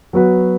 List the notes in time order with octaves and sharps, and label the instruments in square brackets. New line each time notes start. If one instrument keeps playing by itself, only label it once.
[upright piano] F#3 B3 F#4 B4